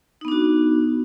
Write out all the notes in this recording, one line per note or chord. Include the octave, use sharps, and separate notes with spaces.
B3 D4 D#4 F#4